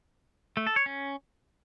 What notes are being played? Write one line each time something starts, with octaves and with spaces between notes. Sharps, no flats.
A3
A4
C#5
C#4